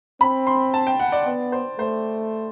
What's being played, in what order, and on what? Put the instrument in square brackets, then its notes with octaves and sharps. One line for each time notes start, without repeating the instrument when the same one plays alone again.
[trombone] C4 [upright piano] B5
[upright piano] C6
A5
G5
F#5
D5
[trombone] B3 [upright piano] D5
[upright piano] C5
[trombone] A3 [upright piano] C5